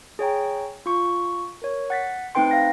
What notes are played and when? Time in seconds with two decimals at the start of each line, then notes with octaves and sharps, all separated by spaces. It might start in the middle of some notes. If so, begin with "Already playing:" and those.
0.19 G#4 C#5 G5 A#5
0.86 F4 C#6
1.62 A#4 C#5
1.90 F#5 A6 B6
2.35 A3 C4 D#4 B4 G5 C6
2.51 F5 G5 A#6